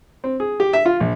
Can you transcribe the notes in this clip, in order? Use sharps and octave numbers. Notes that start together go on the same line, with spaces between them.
C4
G#4
G4
E5
F4
A#1